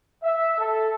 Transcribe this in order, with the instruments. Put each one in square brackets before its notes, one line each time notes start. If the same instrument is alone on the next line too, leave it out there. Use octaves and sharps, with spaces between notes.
[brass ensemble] E5
A4